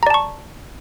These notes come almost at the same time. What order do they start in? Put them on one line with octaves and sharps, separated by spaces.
A#5 D5 A5 C#6